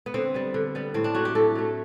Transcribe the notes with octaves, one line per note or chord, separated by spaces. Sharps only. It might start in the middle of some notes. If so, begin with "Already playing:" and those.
B3
D3 C4
G3 B3
D3
G3 B3
A2 C4
D4
F#3 A3 F#4
G4
A2 A4
F#3 A3